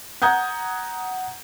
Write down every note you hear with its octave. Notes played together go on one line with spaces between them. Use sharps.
F#5 A#5 D#6 G6 G#6